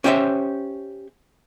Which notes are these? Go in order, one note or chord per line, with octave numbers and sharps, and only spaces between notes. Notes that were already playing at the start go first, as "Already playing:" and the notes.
C#4 G4 C5 C#5 E5